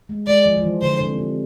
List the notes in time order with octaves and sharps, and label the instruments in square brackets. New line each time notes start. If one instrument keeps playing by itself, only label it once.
[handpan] G#3
[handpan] G#3 [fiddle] D5
[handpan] F3
F3
E3
[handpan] D3 [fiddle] C5
[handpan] C3
C3